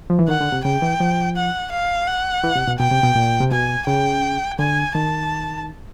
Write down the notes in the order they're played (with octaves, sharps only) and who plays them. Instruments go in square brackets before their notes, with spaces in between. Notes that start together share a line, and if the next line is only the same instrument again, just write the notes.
[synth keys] F3
E3
[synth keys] D#3 [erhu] F#5
[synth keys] D3
C3
[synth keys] C#3 [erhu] G5
[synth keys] E3
F3
[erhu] F#5
F5
F#5
[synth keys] E3
C3
B2
[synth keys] B2 [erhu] G5
[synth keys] C3
B2
A#2
C3
[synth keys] B2 [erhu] G#5
[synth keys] C#3 [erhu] G5
[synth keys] D3 [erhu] G#5
[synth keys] D#3 [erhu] A5